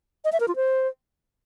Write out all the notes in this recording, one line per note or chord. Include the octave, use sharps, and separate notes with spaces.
D#5
E5
A#4
F4
C5